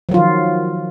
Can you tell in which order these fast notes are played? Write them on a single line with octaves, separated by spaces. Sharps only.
F3 F#3 F4 D#3